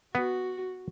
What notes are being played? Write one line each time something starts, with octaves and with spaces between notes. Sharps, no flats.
B3 F#4